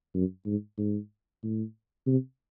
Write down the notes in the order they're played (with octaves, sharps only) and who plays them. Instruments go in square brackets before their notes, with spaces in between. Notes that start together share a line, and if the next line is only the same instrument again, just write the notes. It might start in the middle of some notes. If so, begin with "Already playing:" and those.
[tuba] F#2
G#2
G#2
A2
C3